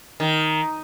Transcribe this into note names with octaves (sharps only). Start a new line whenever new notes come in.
D#3